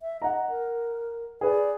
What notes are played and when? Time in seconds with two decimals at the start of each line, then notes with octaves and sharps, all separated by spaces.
0.01 E5
0.22 D#5 F#5 A#5
0.50 A#4
1.41 G#4 B4 D5